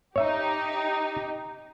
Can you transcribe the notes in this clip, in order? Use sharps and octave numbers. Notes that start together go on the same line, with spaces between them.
D#4 G4 C#5 E5